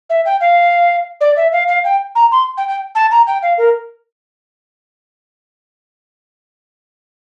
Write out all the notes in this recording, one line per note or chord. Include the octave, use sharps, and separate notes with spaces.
E5
G5
F5
D5
E5
F5
F5
G5
A#5
C6
G5
G5
A5
A#5
G5
F5
A#4